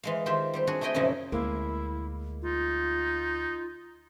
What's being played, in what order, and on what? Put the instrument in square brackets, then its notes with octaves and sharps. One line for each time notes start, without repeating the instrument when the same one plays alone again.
[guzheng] E3 G#3 F5
D#3 F4 G4 C5 E5
G3 C4 G4
D4 F#4 G#4
A3 E4 G#4 D#5 G5 G#5
F#2 A#2 C#3 F3 D#4 E4
[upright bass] D2 [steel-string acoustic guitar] G#3 A#3 [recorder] E4
[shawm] D#4 [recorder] F4